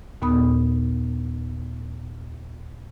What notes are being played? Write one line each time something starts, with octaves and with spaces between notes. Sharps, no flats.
D#2 A#2 B3 B5 D#6